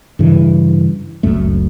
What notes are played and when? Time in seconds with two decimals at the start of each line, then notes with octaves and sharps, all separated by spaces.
0.19 G2 C#3 E3
1.23 F#1 C#2 F#2 A3